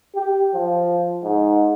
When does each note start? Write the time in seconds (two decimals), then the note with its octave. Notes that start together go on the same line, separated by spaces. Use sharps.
0.15 G4
0.55 F3
1.23 G#2